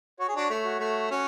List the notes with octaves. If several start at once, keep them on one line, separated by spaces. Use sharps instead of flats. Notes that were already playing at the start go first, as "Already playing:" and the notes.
F#4 C#5
G#4
D4 F#4
A3
F#4
A3
C#4 F#4